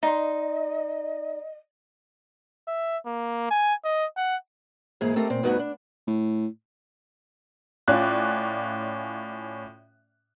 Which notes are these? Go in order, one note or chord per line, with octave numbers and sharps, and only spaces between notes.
D#4 D5 D#5 C6
E5
A#3
G#5
D#5
F#5
G#2 E3 A#3 G#4
A3 C4 G4 A4 A#4 D#5
A#2 C4
D2 G2 B3 D#4 F#4 B4
D4
A2
A2 C#4 F4 D5 F#6